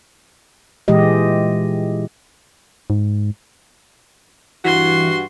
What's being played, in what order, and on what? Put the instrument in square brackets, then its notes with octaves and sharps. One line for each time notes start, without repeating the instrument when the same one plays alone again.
[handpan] A#2 E3 G#3 G4 D#5
[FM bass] G#2
[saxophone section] G2 F#4 [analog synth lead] E3 [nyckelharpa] C6